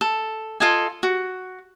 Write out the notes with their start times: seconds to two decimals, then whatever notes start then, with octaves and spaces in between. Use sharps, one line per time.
0.01 A4
0.60 F4 A4 D#5 G#5
1.03 F#4